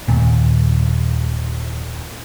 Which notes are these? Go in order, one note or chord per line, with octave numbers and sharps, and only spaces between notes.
D#2 A#2